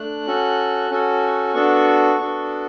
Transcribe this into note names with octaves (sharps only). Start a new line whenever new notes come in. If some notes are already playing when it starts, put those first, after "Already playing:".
Already playing: A3 D4 F#6
C#4 F#4 A4
C#4 F#4 A4
B3 D4 F#4 A4 C#6
B3 D4 F#4 A4